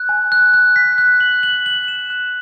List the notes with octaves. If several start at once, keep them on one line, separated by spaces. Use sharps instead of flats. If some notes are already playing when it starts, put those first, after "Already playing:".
Already playing: F#6
G#5
F#6
F#6
B6
F#6
F#7
F#7
F#7
E7
F#6